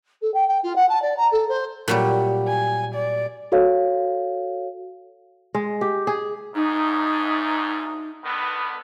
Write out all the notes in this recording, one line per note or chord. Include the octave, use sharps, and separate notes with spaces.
A4
G5
G5
F4
F#5
A5
D5
A#5
A4
C5
A#2 F#3 G3
G#5
D5
F#4 A4 C#5 F5
G#3
G4
G#4
D2 G#2 D#4
D3 D#3 B3